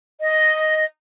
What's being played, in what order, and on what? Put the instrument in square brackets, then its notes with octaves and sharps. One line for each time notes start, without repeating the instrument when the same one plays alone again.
[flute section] D#5